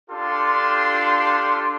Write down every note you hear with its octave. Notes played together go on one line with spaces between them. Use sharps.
D4 F4 G4 A4 C6